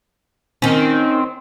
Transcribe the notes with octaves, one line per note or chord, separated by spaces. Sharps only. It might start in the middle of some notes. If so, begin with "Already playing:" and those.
D#3 C4 C#4